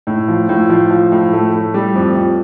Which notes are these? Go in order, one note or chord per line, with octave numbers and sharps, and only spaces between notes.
A2
F3
A2
F3
F3
A2
A3
A2
G3
F2
F2